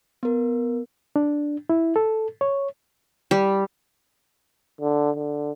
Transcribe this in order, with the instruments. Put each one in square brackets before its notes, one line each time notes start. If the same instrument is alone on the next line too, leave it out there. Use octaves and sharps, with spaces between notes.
[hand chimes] B3 A#4
[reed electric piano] D4
E4
A4
C#5
[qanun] G3
[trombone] D3
D3